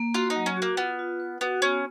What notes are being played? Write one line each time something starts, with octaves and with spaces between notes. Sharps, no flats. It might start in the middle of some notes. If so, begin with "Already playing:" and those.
Already playing: A#3
F4 F#4
D#4
F#3
C#4
A#3 F#4
B3 F4
F4
B4
B3 F#4
B3 C#4